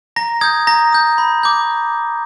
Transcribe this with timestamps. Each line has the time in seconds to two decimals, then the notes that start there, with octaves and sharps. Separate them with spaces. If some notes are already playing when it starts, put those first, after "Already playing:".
0.16 A#5 A#6
0.41 D#6 G6 G#6
0.67 A#5 A#6
0.92 D#6 G6
1.18 B5
1.43 D6 G6